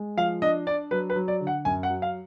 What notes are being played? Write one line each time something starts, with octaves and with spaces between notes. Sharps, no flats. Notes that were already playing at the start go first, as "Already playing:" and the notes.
Already playing: G#3
F3 F5
D4 D#5
D4 D5
F#3 B4
B4
F#3
D5
D3
F#5
F#2 G#5
F#5
F#3
F5